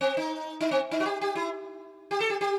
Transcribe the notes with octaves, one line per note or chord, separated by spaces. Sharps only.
C4
D#4
D#4
C4
D#4
F#4
G4
G4
E4
G4
A4
G4
G4